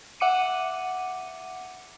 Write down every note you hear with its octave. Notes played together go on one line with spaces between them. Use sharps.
E5 F#5 D6 C#7 D#7